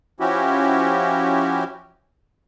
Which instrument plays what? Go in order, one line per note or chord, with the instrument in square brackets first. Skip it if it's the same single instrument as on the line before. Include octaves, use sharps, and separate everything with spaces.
[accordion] F3 C#4 E4 F#4 G4